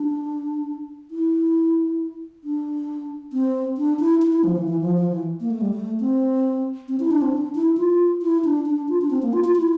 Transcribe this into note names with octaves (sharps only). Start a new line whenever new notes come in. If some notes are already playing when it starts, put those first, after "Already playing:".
Already playing: D4
E4
D4
C4
D4
E4
E4
E4
F3
E3
E3
F3
F3
E3
A#3
A3
G3
A3
C4
C4
E4
D4
C4
D4
E4
F4
E4
D4
D4
F4
D4
C4
A#3
F4
F4
E4